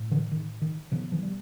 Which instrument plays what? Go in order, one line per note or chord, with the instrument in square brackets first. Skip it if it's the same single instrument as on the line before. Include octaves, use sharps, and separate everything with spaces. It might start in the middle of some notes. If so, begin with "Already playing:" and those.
Already playing: [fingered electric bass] A2
D3 E3
D#3
D#3
B2 D#3 F3
D#3 F3
G3